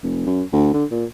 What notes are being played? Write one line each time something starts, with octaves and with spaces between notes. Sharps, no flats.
F1
F#2
D2
D3
A#2